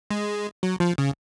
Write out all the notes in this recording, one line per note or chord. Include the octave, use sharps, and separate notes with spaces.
G#3
F#3
F3
C#3